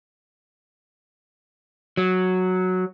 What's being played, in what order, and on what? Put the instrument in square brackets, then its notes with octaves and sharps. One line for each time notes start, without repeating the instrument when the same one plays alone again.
[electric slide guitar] F#3